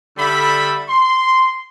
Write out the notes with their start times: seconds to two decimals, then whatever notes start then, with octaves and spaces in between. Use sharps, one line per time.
0.17 D3 G3 A4 E5 B5
0.89 C6